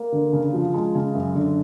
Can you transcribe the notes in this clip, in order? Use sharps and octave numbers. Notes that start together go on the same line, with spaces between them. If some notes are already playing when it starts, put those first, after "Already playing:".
Already playing: A#3
D3
C#3
F3
G#3
C#3
F#2
D3